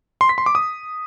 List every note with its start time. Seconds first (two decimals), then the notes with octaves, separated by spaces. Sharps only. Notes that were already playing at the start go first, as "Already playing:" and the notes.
0.21 C6
0.29 B6
0.38 C6
0.46 D6
0.55 D#6